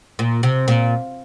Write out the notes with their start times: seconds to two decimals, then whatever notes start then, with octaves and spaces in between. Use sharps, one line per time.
0.19 A#2
0.43 C3
0.68 A#2